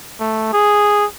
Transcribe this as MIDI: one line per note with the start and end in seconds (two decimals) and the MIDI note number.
0.20 0.49 57
0.53 1.05 68